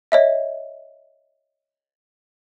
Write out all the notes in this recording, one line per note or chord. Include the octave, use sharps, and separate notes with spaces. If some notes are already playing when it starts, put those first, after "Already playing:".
C#5 D#5 E5